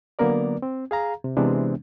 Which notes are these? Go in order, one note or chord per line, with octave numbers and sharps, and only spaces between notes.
D3 F#3 A#3 B3 A#4 D5
C4
G#4 F5 A#5
C3
C3 E3 G#3 B3 C4 D4